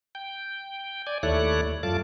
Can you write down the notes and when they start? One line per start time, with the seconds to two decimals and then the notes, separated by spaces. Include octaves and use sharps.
0.15 G5
1.07 D5 G#5
1.23 D#2 A3 E4 C#5 D5 F#6
1.83 F#2 A3 F4 A5 D6